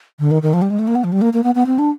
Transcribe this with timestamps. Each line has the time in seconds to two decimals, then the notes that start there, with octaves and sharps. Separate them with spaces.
0.19 D3
0.31 D#3
0.42 D#3
0.53 F3
0.62 G3
0.70 G#3
0.79 A3
0.88 A#3
0.95 B3
1.04 F3
1.12 G3
1.21 A#3
1.33 A#3
1.44 B3
1.55 B3
1.66 C4
1.79 D4